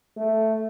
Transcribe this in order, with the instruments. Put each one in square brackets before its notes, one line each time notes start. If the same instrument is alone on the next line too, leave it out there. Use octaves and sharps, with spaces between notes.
[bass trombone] A3